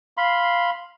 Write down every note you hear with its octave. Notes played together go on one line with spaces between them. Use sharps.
F5 B5 C6